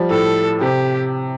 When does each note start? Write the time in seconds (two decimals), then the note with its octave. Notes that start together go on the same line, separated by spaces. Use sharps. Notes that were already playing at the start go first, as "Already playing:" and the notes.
Already playing: F3 G3
0.10 A2 A4
0.61 C3 G4